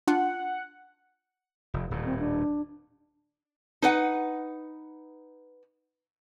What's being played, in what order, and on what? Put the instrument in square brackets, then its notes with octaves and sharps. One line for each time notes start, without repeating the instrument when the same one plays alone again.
[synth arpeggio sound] D4 F4 [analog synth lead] F#5
[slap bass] F1
D#1 A2
[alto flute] C4
D4
[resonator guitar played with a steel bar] D#4 B4 F#5